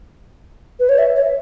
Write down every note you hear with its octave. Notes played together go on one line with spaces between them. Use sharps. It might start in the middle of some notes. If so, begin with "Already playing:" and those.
B4
C#5
E5
C#5